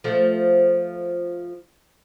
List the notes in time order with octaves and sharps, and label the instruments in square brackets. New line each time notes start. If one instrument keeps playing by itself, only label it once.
[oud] F3 A3